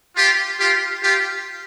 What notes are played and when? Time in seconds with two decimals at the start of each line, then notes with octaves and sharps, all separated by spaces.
0.15 F4 G4
0.58 F4 G4
1.01 F4 G4